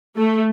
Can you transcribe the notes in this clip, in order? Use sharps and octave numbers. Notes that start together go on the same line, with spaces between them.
A3